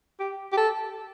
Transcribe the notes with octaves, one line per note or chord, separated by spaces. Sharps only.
G4
G4
A4